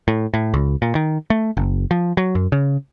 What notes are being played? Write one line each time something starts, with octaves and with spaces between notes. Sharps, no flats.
A2
A2
C#2
A#2
D#3
A3
F#1
F3
F#3
F#2
C#3